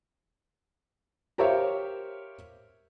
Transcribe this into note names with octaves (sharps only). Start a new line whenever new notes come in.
G4 A#4 C5 C#5 E5 F5